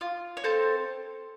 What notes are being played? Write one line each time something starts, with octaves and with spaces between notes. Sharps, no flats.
F4
C#5
C4 A4 C5